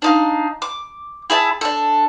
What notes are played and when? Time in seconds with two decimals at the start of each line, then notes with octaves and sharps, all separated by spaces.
0.02 D4 D#4 F5
0.62 D6
1.30 E4 G#4 E5 A5
1.61 D4 A4